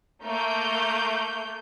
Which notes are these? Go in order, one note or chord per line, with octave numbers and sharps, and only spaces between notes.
A3 A#3 G6